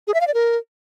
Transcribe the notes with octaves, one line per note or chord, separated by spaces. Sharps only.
G#4
E5
F5
D5
A#4